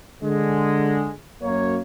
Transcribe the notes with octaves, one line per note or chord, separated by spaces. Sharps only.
D3 G#3
F#2 A#3 C#5